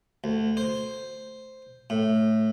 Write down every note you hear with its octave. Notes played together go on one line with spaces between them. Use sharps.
D2
C5
A2